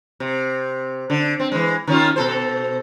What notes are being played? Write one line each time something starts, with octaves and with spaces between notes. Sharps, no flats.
C3
D3
C4
E3 G#3
D#3 C#4 F4
B2 A4 C5